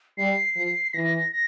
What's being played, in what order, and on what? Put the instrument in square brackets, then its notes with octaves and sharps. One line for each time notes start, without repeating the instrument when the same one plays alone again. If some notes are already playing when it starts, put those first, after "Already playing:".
[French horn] G3 [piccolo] C7
[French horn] F3
[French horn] E3 [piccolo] A#6
[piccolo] A#6